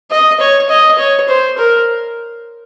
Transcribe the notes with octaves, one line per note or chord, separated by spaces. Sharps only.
D#5
C#5
D#5
C#5
C5
A#4